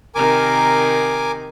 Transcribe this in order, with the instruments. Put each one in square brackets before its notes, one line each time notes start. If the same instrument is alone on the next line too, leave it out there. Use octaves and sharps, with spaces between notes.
[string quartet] C3 D#3 [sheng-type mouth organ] A#4 G#5 D6